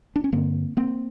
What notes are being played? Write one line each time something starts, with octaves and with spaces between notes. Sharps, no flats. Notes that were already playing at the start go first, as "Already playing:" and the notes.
D4
C#4
G2 D3 A#3 C4
A#3 C4